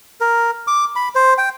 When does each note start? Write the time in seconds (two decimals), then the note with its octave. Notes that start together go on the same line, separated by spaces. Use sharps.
0.20 A#4
0.67 D6
0.96 B5
1.15 C5
1.38 G5